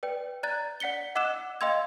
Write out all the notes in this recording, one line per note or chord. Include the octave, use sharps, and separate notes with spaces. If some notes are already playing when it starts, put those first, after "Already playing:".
B4 D5 G5
D5 A#5 F#6 G#6 A6
D5 F#5 B6 C#7 G7
D#5 F#5 D6 E6 F#6 E7
D#5 F5 G5 C6 E6 G#6